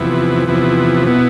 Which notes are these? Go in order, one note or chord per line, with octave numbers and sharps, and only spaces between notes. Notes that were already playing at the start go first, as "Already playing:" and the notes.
Already playing: E2 C3 F3 B3 E4
E2 C3 F3 B3 E4
B2 B3 E4